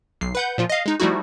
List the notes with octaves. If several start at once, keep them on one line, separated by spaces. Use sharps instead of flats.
B1 C7
B4 F#5 G6
A#2 F3 F4
D#5 F5
G#3 D#4
F3 G3 A3 D#4 E4 F#4